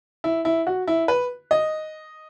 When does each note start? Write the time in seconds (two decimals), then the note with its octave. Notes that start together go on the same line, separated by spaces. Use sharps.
0.24 E4
0.45 E4
0.67 F#4
0.87 E4
1.08 B4
1.51 D#5